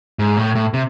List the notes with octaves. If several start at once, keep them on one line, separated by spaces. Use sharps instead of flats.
G#2
A2
A2
C3